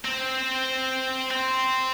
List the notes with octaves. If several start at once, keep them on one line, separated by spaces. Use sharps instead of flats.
C4
C4